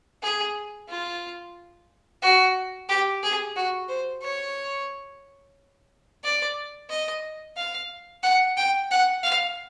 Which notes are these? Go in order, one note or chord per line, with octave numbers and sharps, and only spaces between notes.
G#4
F4
F#4
G4
G#4
F#4
C5
C#5
D5
D#5
F5
F#5
G5
F#5
F5